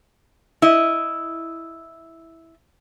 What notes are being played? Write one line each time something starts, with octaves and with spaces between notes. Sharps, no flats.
E4 D#5